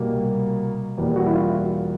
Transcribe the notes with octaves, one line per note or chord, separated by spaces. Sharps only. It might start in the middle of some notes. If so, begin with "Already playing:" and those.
Already playing: C2 B2 G3 A#3
E2 B2 G3 A#3
F#4
E4
F4